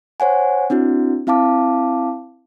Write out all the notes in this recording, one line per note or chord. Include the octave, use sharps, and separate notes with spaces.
C5 C#5 F#5 G#5
C4 D4 E4 F#4
C4 E4 F5 A5 D6